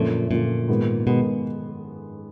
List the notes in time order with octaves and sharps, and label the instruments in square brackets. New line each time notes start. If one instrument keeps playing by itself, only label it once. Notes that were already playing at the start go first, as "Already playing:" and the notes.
Already playing: [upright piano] F#2 D3 F3 A3 [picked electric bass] A#2
[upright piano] F#2 D3 F3 A3 [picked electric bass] A#2
[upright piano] G#2 D#3 G#3 B3
[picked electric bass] B2 [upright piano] D#3 G#3 B3